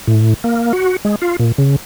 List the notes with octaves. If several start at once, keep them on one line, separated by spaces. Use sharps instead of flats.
A2
A#3
F#4
G#3
F4
A#2
C#3